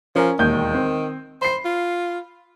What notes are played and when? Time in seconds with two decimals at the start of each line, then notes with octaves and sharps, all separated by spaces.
0.16 F3 C#4 A#4 G#5
0.39 E1 D#2 D#3 G6
0.74 C4
1.42 C5 B5 C7
1.65 F4